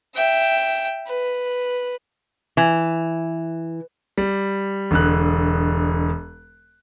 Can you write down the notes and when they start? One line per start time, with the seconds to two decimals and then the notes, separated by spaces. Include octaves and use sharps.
0.14 E5 G5
1.07 B4
2.57 E3
4.18 G3
4.91 E1 D3 F#6